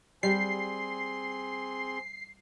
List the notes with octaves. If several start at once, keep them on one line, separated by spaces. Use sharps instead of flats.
G3 C4 G#4 C6 C7